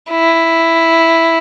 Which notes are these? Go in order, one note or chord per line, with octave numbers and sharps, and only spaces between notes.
E4